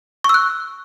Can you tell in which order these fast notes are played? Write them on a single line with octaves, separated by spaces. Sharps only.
C#6 E6 F#6